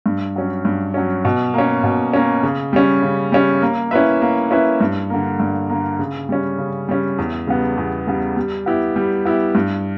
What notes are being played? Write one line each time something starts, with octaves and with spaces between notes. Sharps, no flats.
G2
F#3 C#4
G2
F#3 C#4
B2
A#3 C#4
B2
A#3 C#4
C#3
G3 C#4
C#3
G3 C#4
A#3
C#4 E4 B4 E5
A#3
C#4 E4 B4 E5
G2
D3 A#3
G2
D3 A#3
C#3
G3 C#4
C#3
G3 C#4
E2
C#3 G3 B3
E2
C#3 G3 B3
G3
B3 E4 G4
G3
B3 E4 G4
G2